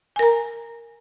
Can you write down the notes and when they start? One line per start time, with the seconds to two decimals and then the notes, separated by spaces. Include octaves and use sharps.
0.16 G#5
0.19 A#4
0.23 A#5